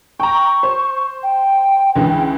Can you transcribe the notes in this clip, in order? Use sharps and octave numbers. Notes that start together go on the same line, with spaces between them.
G5 A#5 C#6
C5
G5
C#2 D3 E3